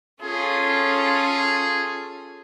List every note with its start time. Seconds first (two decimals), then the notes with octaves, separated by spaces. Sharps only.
0.22 C#4 F4 G#4 A4